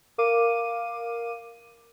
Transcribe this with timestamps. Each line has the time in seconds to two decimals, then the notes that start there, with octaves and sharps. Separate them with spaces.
0.18 A#4 F5 D6 D#7